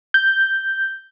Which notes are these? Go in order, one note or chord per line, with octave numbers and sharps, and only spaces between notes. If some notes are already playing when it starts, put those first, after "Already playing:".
G6